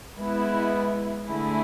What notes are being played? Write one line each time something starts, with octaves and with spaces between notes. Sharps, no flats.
G#3 B3 E4
D3 A3 E4 G#4